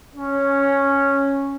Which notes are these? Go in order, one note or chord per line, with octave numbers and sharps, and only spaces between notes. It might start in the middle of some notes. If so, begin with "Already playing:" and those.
C#4